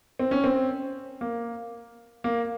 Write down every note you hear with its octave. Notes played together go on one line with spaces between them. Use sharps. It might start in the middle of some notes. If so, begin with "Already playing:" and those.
C4
C#4
C4
A#3
A#3